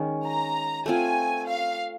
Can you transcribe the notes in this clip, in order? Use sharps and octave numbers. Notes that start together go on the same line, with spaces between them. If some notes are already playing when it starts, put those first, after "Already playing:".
Already playing: D#3 G#3 C#4
A#5
A3 C4 F4 G#5
F5